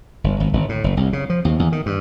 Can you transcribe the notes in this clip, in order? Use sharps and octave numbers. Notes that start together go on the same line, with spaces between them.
G1
G#1
G1
A2
F#1
C2
C#3
F3
D#2
E2
D#3
G2